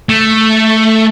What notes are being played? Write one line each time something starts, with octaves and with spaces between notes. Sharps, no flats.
A3